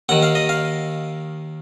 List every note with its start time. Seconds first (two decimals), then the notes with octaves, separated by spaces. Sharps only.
0.09 D#2 D#3 F#5
0.23 F5
0.35 D#5
0.49 F5